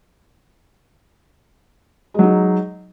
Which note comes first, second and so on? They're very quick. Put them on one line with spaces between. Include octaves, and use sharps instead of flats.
G#3 F#3 D#4